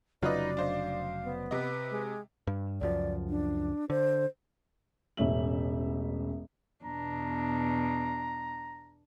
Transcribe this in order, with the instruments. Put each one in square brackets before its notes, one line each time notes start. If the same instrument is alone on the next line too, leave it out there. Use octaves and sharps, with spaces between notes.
[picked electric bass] F1 C#3 F#3 [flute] D#4 [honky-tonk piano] F4 B4 D#5 [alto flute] D5
[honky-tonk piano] D4 C5 D#5 [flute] F5
[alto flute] B3
[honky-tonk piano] C3 D#5 [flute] B4
[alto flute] G#3
[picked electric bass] G2
[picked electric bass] C#2 F#2 F3 [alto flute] D5
[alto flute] D4
[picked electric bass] D3 [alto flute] C5
[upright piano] E1 A1 C#4 E5 F#7
[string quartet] E2 B2 D4 [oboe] A#5